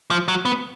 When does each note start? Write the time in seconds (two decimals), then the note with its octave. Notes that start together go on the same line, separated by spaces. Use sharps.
0.11 F3
0.28 F#3
0.45 B3